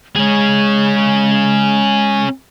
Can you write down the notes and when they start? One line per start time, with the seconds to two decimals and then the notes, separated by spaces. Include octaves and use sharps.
0.15 G#3 C#4 G#4